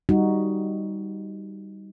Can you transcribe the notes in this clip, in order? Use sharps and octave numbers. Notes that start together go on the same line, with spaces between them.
G3 D#4 F#4